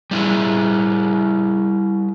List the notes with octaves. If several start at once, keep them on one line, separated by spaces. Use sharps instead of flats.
G3 E4 G#4